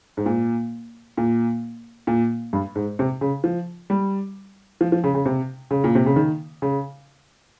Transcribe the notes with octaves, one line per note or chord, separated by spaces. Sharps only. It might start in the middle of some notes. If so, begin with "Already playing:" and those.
G#2
A#2
A#2
A#2
G2
G#2
C3
C#3
F3
G3
F3
F3
C#3
C#3
C3
C#3
A#2
C3
C#3
D#3
C#3